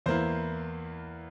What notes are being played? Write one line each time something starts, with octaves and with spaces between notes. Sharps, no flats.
E2 E3 A#3 E4 C5